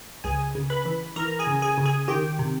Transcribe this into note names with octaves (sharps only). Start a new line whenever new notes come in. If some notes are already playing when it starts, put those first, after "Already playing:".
C#2 G#4 G#5
C#3
B4 B5
E3
E3 A#4 A#5
G#4 G#5
C#3
G#4 G#5
C#3
G#4 G#5
D#3 G4 G5
C3